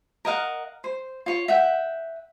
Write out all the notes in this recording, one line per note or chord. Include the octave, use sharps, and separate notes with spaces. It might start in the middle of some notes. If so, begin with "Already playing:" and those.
A#4 D#5 F5 F#5
C5
F4 C#5
E5 F#5 G5